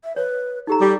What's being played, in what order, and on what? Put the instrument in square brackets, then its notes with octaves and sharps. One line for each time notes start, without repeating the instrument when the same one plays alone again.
[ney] E5
[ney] B4 [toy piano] C#5
[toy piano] D#4 G4 A#5 [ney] A4
[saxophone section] G3 [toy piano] D6